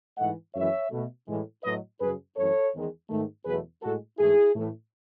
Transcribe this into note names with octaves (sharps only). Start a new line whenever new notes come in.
G#2 E3 A3 D#5 F#5
F#2 E3 G#3 C#5 E5
B2 A3
A2 E3 G#3
A2 F#3 A3 B4 D#5
F#2 C#3 F#3 G#4 B4
F#2 E3 A3 A4 C#5
E2 D#3 G#3
G#2 D#3 A3
E2 B2 F#3 A3 G#4 B4
A2 G#3 F#4 A4
G#2 E3 A3 E4 G#4
A2 E3 A3